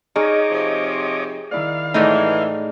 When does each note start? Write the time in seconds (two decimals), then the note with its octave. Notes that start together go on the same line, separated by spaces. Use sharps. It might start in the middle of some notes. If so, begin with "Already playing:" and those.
0.16 D#4 G#4 C#5 D#5 C#6 D6 F6
0.50 C3 F3 C4
1.51 D#3 E4 D5 F5
1.94 A2 E3 G#3 A3 D#4 C#5 D5